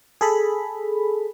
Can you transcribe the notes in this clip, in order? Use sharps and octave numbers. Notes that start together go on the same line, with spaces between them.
G#4 A4 B5